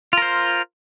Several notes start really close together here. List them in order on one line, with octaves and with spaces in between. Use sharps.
F4 A#4 C5